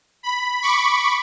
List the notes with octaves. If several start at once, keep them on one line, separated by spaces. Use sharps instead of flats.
B5
B5 C#6 D6